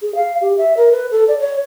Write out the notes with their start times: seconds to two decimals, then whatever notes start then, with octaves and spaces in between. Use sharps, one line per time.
0.02 G#4
0.15 F5
0.41 G4
0.58 E5
0.77 A#4
0.92 B4
1.11 A4
1.28 D5
1.39 C#5